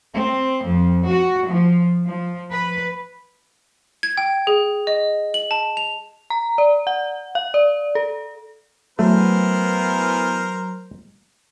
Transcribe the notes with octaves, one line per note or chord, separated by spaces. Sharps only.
C4
F2
F#4
F3
F3
B4
G#6
G5
G#4
D#5
F#7
A5
F7
A#5
D5
F#5
F5
D5
A4
E3 F#3 A3 B3 A#4 C5